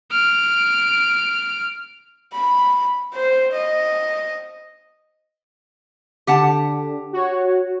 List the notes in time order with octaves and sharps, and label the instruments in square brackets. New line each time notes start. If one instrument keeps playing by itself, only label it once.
[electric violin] F6 D7
[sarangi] B5
C5
D#5
[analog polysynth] D3 [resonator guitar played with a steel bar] G4 F#5 A5
[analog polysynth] F#4 C#5